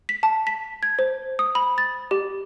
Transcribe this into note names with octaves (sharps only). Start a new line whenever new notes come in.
B6
A5
B6
G#6
C5
D#6
B5
A6
G4